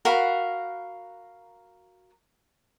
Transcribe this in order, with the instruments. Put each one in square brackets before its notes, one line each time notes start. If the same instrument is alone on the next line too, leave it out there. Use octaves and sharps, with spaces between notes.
[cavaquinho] F#4 A#4 F5 B5